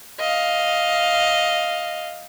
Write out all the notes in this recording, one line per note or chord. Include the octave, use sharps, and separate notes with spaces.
D#5 F5